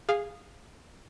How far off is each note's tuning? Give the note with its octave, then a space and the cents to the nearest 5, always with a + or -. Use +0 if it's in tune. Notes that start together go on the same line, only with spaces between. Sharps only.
G#4 -15 F5 +0